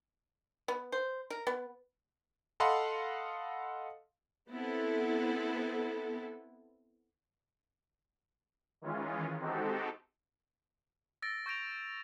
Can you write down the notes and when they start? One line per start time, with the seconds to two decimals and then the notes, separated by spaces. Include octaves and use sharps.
0.68 B3
0.92 C5
1.30 A#4
1.47 B3
2.60 A4 D#5 F5 F#5 B5 C6
4.50 B3 C4 E4 A4
8.82 D#3 E3 G#3 C#4 F4
9.39 G#3 C4 D#4 F#4 G4 A4
11.22 E6 A6 A#6 D7
11.46 C#6 G6 A#6 D7 F7